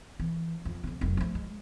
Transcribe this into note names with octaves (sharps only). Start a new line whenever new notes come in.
E3
F2
F2 C#3
F1 F#2
F3 A3
G#3